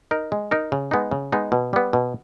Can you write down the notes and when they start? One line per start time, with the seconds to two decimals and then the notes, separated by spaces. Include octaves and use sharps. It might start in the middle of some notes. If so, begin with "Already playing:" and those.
0.11 D#4 A#4
0.32 G#3
0.51 D#4 A#4
0.72 C#3
0.91 G#3 B3 D#4
1.11 C#3
1.32 G#3 B3 D#4
1.52 B2
1.73 G3 B3
1.93 B2